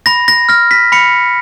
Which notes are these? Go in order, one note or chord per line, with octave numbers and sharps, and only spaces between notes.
B5 A#6
A#6
F6 A#6
B6
B5 C#7